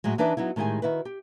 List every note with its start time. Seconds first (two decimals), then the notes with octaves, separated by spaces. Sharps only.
0.04 A2 F#3 G#3
0.18 E3 D4 D#4 B4 D5 E5
0.37 F#3 B3 D#4 E4
0.56 A2 D#3 G#3 E4 G4 G#5
0.82 D#3 E4 F#4 B4
1.05 G4